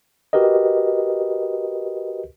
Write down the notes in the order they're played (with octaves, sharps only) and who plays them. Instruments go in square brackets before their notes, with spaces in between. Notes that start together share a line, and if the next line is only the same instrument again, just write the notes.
[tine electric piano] F#4 G4 A#4 B4 D#5